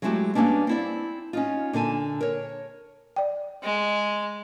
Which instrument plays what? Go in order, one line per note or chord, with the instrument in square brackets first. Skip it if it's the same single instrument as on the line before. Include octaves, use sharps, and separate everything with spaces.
[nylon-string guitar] F#3 G#3 A3 E4 F#4 G4
G3 A#3 B3 C#4 D4
C4 E4 D5
C#4 D#4 F4
A#2 D3 A4 G#5
A#4 C#5
[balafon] D5 G5
[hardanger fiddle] G#3